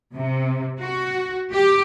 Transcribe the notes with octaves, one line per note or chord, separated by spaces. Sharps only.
C3
F#4
G4